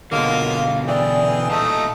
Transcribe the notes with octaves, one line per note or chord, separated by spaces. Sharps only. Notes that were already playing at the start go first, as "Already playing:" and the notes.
B2 D3 F#3 G#3 A#3 F4 F5
E3 G#4 D5 G5
A#2 A3 D#4 D#5 F5 A5 D#6